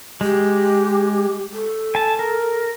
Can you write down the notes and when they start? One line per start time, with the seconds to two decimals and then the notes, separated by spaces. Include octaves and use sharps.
0.21 G#3 G4
1.53 A4
1.95 G#5 A5
2.19 A#4